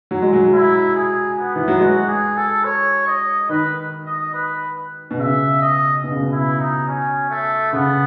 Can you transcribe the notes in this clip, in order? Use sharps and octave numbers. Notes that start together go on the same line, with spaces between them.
F#3
G#3
F#3
E4
G#4
B3
E3
F#3
G#3 F#4
G#4
A4
C#5
D#5
D#3 B4
D#5
B4
B2
C#3 E5
D#5
B2
C#3
B2
E4
D#4
C#4
A3
C#3 B3